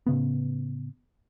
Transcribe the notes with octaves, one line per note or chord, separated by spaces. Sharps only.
A2 C#3 B3